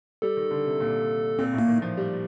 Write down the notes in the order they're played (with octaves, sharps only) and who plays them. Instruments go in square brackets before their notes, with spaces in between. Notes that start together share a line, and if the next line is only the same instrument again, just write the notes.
[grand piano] G3 [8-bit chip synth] A4
[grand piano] D#3
D3
C3
A#2
[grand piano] A#2 [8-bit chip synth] C4
[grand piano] A2
[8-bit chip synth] A#3
[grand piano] D#3
F3
G3